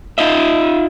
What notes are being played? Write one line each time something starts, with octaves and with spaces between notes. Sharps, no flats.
D#4 F4 D#5 E5